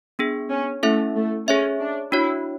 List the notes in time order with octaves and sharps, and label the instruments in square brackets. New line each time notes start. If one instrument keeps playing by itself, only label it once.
[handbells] B3 D4 G#4
[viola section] C#4
[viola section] A3 [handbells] C#4 E4 A4 E5
[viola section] A3
[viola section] C#4 [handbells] G#4 C#5 E5
[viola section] D4
[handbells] D4 F#4 C#5 [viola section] E4